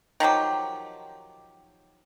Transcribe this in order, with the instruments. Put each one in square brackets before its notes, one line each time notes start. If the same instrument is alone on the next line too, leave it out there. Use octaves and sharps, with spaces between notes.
[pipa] D#3 F3 F#3 G4